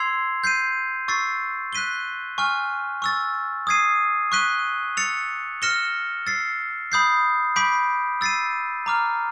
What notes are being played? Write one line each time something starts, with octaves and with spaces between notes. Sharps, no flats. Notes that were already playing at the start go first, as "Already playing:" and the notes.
Already playing: C6 E6 G#6 C7 F7
G6 C7 D#7
C#6 E6 A6 C7
F#6 B6 D#7 G7
G#5 C#6 F6
C#6 E6 A6
D#6 G#6 C7 D#7
C#6 F#6 B6 D#7 G7
E6 A6 C#7 F7
F6 A#6 C#7 E7 G7
E6 A6 C7
B5 D#6 G6 C7
B5 D6 G6 B6 D7
E6 A6 C7 D#7
A#5 D6 F6